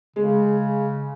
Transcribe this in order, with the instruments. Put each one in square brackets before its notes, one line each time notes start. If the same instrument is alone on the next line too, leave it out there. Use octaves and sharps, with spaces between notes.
[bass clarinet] C#3 [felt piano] G#3